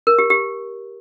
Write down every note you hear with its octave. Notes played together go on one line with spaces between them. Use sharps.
A#4
G4
G4